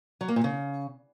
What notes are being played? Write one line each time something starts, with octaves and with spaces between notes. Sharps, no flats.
F#3
A#3
A#2
C#3